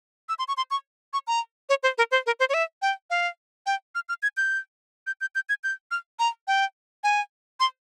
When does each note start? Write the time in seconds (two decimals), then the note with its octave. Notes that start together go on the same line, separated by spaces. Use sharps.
0.29 E6
0.39 C6
0.48 C#6
0.57 C6
0.71 C#6
1.13 C#6
1.27 A#5
1.69 C#5
1.83 C5
1.98 A#4
2.11 C5
2.26 A#4
2.40 C5
2.49 C#5
2.54 E5
2.82 G5
3.10 F5
3.66 G5
3.95 F6
4.09 F6
4.23 G#6
4.37 G6
5.07 G6
5.21 G6
5.35 G6
5.49 G#6
5.64 G6
5.91 F6
6.19 A#5
6.48 G5
7.04 G#5
7.60 C6